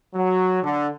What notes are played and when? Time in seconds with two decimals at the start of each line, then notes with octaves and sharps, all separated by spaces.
0.15 F#3
0.63 D3